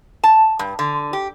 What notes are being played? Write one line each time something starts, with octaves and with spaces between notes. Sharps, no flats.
A5
G2
D3
G4